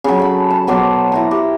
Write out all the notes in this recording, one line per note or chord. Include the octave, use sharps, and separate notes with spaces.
C#3 F#3
A4 B5
A5
B2 F#3 C5 D6
E4 F#4 A#5
G4